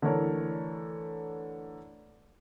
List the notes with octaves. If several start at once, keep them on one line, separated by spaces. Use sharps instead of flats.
D3 E3 A3 A#4 C#5